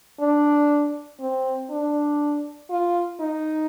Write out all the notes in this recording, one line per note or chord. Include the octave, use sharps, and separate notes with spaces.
D4
C4
D4
F4
D#4